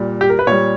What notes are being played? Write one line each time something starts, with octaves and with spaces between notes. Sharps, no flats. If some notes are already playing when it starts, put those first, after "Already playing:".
Already playing: A#2 G3
G4
A#4
B4
A#2 G3 C#5